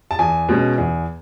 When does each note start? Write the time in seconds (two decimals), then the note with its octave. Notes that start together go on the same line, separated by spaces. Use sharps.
0.11 A5
0.19 E2 G#5
0.49 B2 G#3 C#4
0.78 E2